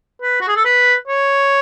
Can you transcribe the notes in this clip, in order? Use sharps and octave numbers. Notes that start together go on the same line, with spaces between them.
B4
F#4
G#4
A4
B4
C#5